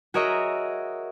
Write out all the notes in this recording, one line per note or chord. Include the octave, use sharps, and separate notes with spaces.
F#4 G#4 A#4 C#5 D#5 E5